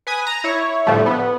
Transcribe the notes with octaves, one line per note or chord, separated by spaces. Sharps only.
B4 G#5 D#6
A#5
E4 C#5
A2 D3 F3 G3 A3
B3